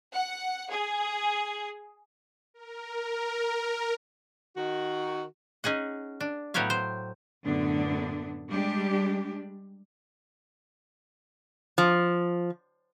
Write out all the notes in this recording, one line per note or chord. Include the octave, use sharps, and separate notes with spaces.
F#5
G#4
A#4
D#3 F#4
C#4 D#4 G#4 F#5
D4
A2 F#3 B3 G4 C#5 F5
C5
F#2 A2 D3 B3 D4
G3 G#3 D4 G4
F3